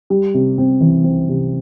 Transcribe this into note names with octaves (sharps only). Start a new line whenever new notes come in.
G3
C3
C4
E3
C4
C3